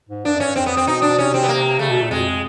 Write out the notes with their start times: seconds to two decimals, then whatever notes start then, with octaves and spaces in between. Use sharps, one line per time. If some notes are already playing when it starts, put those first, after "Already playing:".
0.09 G#2
0.25 G2 D4
0.34 F#2
0.40 G2 C#4
0.56 F2 C4
0.66 B3
0.77 C4
0.87 B2 D#4
1.02 D4
1.18 C3 C#4
1.34 C4
1.43 B3
1.48 A#3
1.79 C#3 A3
1.90 B2
2.01 A#2
2.10 F2 G#3